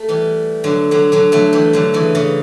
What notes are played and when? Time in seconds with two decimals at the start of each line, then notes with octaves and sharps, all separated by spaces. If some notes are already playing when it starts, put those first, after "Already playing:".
Already playing: A3
0.09 E3 G3
0.64 D3 F#3
0.91 D3 F#3
1.12 D3 F#3
1.32 F#3 A3
1.53 E3 G3
1.73 D3 F#3
1.94 C#3 E3
2.15 C#3 E3